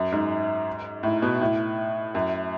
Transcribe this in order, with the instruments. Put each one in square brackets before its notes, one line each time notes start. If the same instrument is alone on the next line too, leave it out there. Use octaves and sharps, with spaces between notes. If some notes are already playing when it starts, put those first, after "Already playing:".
Already playing: [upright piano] F#2
G#2
A2
B2
A2
F#2